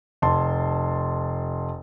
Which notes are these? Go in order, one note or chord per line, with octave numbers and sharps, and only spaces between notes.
F1 A5 C6